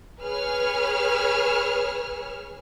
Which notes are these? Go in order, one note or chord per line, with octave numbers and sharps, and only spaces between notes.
G#4 B4 C#5 F6